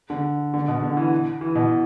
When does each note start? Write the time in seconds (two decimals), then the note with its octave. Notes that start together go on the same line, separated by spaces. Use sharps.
0.10 D3
0.54 D3
0.68 B2
0.83 D3
0.97 E3
1.41 E3
1.55 B2